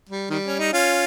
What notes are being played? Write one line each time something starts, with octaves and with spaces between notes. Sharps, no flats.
G3
D#3 G3
C#4
D#4
C#4 F4